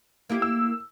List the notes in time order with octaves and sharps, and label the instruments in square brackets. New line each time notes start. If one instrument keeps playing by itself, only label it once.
[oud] A#3 E4 G4
[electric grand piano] E6